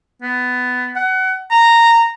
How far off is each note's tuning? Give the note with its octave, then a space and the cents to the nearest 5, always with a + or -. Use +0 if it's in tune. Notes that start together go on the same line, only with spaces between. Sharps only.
B3 +15
F#5 +25
A#5 -10